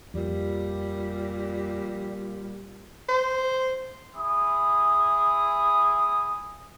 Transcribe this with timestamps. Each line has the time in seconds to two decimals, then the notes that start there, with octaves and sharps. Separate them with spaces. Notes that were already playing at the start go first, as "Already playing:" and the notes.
0.14 F2 A#2 G3
3.09 C5
4.16 E4 G#4 D#6